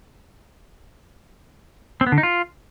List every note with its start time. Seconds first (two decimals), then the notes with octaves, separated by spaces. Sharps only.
2.01 C4
2.07 B3
2.12 D3
2.18 D#4
2.23 F4